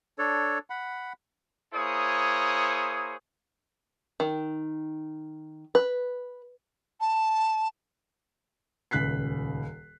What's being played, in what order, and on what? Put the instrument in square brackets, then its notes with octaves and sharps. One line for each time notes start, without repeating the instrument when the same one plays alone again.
[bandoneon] D4 A4 C#5
F#5 B5
[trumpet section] A#3 E4 G#4 C5 C#5 D#6
[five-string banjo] D#3
B4
[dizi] A5
[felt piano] D#1 C#2 F#6 B6 C7